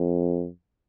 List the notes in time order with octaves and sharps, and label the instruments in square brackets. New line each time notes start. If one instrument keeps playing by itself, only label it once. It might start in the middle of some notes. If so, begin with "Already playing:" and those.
Already playing: [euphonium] F2